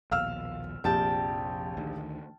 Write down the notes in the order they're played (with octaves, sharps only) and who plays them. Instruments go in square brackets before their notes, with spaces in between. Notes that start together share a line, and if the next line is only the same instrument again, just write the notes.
[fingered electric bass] A#1 D#2 B2 [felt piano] F5 E6 F6
[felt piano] A#1 G4 [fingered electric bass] F2 C3 [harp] G5 A5
[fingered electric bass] D2 D#3